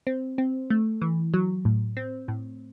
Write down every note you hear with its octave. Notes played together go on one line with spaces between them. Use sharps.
C4
C4
A3
E3
F#3
A2
C4
A2